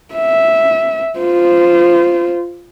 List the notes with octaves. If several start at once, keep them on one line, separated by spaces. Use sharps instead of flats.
E5
F4 C5